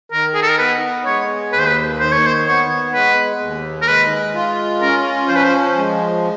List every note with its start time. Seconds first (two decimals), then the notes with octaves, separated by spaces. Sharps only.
0.12 D#3 A#4
0.35 G#4
0.43 A4
0.50 A#4
0.59 B3 B4
1.06 G#3 C#5
1.52 D#2 B4
1.60 C5
1.67 B4
2.00 D#3 C5
2.13 C#5
2.27 C5
2.47 B3 C#5
2.94 G#3 B4
3.41 D#2
3.82 A#4
3.88 G#3 B4
4.35 F4
4.82 C#4 A#4
5.29 F3 C5
5.36 B4
5.44 C5
5.76 G#3